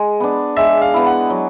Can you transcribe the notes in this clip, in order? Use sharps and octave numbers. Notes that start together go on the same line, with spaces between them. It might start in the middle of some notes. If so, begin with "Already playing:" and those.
Already playing: G#3
B3 D4
G#3 E5
F5
B3 E4
F#5
F#3